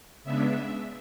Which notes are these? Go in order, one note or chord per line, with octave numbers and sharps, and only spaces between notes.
C#3 G#3 B3 D4 E5